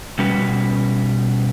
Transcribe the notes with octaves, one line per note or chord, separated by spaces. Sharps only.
B2 G3 C#4 F#4 B4